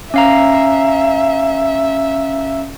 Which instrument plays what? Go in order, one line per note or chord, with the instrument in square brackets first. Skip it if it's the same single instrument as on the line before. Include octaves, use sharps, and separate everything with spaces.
[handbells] C#4 F5 A#5 [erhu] E5